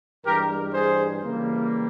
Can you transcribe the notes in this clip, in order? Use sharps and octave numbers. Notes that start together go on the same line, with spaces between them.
G2 E3 G#3 G4 A#4
G#4 C5
C#3 E3 G3 A#3